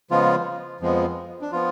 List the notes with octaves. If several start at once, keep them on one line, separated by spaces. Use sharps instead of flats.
C#3 F3 G#3 B3 F4
F2 F3 G#3 B3
D4
F3 B3 F4